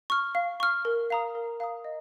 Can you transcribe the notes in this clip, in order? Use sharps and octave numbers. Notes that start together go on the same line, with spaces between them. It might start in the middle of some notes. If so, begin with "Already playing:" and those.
C#6 F6
F5
C#6 F6
A#4
F5 A#5 D#6
A#4
F5 A#5 D#6
D#5